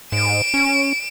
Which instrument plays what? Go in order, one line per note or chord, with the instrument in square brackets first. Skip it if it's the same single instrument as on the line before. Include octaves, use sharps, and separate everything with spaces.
[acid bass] G#2 [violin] D7 E7
[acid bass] C#4